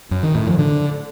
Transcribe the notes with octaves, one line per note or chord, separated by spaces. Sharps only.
F#2
D#3
A2
F3
D3